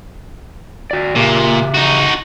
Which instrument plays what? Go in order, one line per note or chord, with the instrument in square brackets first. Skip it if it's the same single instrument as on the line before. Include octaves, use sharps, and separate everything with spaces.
[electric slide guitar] F#4 D5
[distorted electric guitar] A#2 [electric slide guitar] C#3 G4
[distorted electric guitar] D#4 F#4